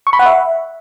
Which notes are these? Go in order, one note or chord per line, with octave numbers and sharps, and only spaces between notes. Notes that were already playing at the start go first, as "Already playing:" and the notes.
C#6
B5
F#5
E5